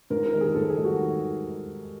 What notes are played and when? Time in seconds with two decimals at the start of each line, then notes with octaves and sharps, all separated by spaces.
0.10 G#2 A#4
0.26 A#4
0.33 D#3 G3
0.41 G#4
0.55 G#2 A4
0.70 G#4
0.77 D#3 G3
0.85 F#4